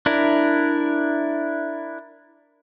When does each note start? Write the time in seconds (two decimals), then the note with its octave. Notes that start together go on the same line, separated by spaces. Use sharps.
0.06 D4 E4 A#4